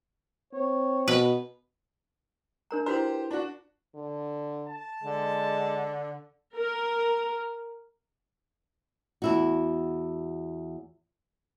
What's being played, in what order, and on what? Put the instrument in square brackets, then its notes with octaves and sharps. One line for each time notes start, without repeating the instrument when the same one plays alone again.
[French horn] C4 [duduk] C#5
[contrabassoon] B2 [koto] B4
[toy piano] D4 A#4 A#5
[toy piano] E4 F#4 B4 [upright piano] G4 C5
[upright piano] D4 F#4
[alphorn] D3
[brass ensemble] A5
[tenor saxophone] D3 [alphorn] G#3
[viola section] A#4
[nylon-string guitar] E2 E4 F#4